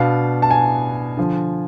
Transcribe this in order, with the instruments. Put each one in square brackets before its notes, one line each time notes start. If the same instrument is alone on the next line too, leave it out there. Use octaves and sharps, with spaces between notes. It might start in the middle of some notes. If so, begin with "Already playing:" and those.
Already playing: [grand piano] B2 B3 D4 F5
A5
G#5
D3 F3